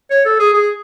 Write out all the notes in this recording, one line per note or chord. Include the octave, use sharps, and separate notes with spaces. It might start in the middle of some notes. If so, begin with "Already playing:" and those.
C#5
A4
G#4
G#4